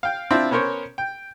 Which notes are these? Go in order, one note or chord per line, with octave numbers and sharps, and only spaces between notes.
F5 G5
C4 D4 E4 F4
B3 C#4 A#4 C5 C#5
G5